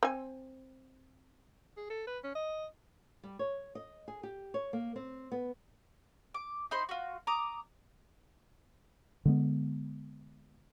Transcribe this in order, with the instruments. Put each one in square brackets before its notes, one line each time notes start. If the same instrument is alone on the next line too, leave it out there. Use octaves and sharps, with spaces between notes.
[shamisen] C4 G#5
[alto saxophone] G#4
A4
B4
C#4
D#5
[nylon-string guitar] G3
C#5
D#5
G#4
G4
C#5
A#3
C4
B3
[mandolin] D6
D#4 C5 B5 C6
F4 F#4
A#5 D6 D#6
[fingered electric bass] D3 G#3 B3